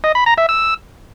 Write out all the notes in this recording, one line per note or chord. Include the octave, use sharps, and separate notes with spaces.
D#5
B5
A#5
E5
E6